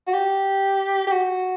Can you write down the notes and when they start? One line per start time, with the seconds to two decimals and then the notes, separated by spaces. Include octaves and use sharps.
0.07 F#4
0.13 G4
1.07 G4
1.12 F#4